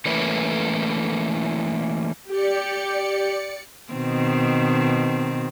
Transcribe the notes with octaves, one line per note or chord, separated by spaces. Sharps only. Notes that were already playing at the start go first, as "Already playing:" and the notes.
E3 A3 A#3 C#4 E4 B4
G4 D5 C#7
B2 D#3 C4